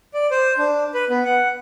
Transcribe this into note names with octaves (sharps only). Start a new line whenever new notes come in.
D5
C5
D4
B4
B3
F#5